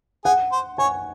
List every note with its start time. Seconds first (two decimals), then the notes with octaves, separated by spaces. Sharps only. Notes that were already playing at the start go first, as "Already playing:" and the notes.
0.25 G#4 F#5
0.52 C5
0.78 C#5 G#5